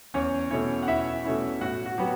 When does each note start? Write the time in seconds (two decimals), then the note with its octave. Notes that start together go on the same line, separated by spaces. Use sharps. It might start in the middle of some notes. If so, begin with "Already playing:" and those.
0.14 E2 C#4 C#5
0.51 B2 A3 C#4 E4 C#5
0.83 F#5
0.87 E2 E4 E5
1.24 B2 A3 C#4 E4
1.61 A2 F#4 F#5
1.86 F#4
1.98 F#3 B3 G4